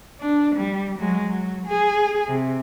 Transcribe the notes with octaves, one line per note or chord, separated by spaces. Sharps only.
D4
G3
F#3 G#3
F#3
G#4
C3